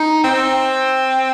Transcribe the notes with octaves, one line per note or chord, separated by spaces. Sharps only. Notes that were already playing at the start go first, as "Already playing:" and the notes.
Already playing: D#4
C4